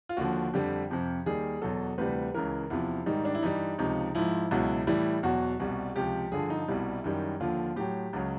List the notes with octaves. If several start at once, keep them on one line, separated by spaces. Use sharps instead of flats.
F4
D#2 D3 F3 F#4
F2 D3 G3 G4
F2 C3 F3
D#2 D#3 G3 G#4
E2 B2 F#3 A4
D2 C3 E3 G3 B4
C#2 C#3 E3 A#4
E2 C3 F3 E4
G#2 D#3 G3 D#4
D4
E4
G2 E3 G3 D#4
C#2 C3 F3 D#4
G#2 F3 E4
C#2 B2 F#3 E4
A2 E3 G3 E4
E2 B2 F#3 F#4
C2 B2 G3 F#4
C#2 C3 F3 G4
G2 D3 F3 G#4
D#4
C2 B2 G3 E4
F#2 D#3 G3
D#2 D3 F3 F4
A2 F#3 G4
C#2 C#3 F#3